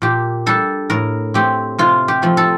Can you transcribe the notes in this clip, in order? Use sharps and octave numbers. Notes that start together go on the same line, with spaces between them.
A#2 G4
G3 D4 A4
A2 A#4
A3 C4 G4
C3 F4
G4
F3 A3 C4
A4